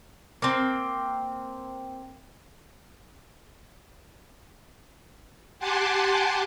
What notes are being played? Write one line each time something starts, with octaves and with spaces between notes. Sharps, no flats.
A#3 C4
G4 F#5 G#5 A5 C6 D6